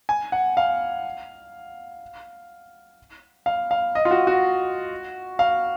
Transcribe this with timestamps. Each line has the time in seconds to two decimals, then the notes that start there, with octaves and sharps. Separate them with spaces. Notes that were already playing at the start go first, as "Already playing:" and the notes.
0.09 G#5
0.32 F#5
0.57 F5
3.46 F5
3.71 F5
3.95 D#5
4.05 F4
4.11 F#4
4.27 F#4
5.39 F5